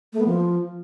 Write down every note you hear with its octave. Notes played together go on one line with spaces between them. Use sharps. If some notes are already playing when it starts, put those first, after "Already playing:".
A3
B3
F3